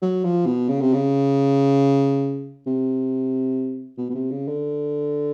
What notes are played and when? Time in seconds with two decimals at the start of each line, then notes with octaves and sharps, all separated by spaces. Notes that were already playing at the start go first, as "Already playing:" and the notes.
0.02 F#3
0.24 F3
0.46 B2
0.68 C#3
0.81 C3
0.94 C#3
2.66 C3
3.98 B2
4.09 B2
4.15 C3
4.31 C#3
4.48 D3